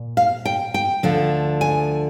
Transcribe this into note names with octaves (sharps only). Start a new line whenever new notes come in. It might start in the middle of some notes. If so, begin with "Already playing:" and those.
Already playing: A#2
F5
G5
G5
D2 D3 F3
G#5